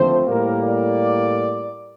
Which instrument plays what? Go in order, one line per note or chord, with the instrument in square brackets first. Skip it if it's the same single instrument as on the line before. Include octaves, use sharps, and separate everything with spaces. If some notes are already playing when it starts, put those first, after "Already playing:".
Already playing: [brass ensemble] D#2 D3 F3 A3 C4 C5
A2 G3 A#3 A#4
D5